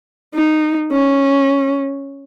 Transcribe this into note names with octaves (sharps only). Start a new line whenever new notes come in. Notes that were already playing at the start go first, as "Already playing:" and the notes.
D#4
C#4